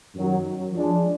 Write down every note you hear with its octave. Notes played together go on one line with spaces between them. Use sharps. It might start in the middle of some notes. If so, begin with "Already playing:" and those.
F#2 D#3 F#3
F3 G#3 D4